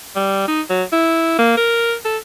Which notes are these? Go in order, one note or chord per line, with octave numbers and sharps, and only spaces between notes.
G3
D#4
F#3
E4
A#3
A#4
A4